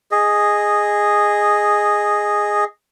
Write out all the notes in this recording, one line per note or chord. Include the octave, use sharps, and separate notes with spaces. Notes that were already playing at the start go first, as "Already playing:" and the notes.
G#4 D#5